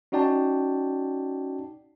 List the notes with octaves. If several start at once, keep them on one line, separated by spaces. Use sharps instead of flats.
C#4 D#4 F#4 D5 G5 A5